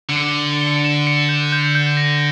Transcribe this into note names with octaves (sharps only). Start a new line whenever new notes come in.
D3
C#7
G7
G7
E7
C#7
G6
G6
G6
A#6